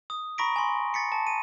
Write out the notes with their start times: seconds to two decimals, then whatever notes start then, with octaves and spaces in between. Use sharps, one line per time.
0.10 D#6
0.38 A#5 B5 C#6 A#6 B6 D7
0.56 G#5 C6
0.94 A6 B6 C#7
1.12 A5
1.27 D#7